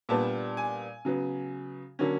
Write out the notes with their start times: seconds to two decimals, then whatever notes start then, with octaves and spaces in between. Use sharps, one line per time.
0.09 A#2 G3 B3 D4 A5
0.57 G#5
1.05 C#3 F#3 B3
1.99 D3 F#3 A#3 C#4